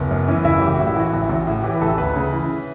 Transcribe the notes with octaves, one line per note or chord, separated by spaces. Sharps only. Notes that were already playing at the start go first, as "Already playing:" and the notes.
Already playing: F#1 B3
F#2
E3 C#4
F#1 E4
A1 G4
F#4
A2
E4
E3 F#4
A1
A1
A2
E3 G4
B4
A1 A4
D2 B4
C#3
E3